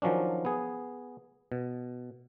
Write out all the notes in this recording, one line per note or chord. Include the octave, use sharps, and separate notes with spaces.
D#3 F3 F#3 C#4 D4
B3 G#4
B2